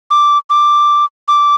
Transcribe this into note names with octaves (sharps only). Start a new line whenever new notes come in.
D6
D6
D6